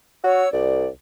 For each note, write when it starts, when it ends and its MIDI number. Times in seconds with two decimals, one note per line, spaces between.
0.24 0.44 66
0.24 0.48 73
0.24 0.48 88
0.53 0.87 36
0.53 0.86 74